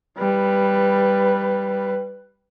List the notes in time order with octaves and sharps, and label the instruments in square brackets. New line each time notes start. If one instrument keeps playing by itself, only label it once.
[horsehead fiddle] G3 B4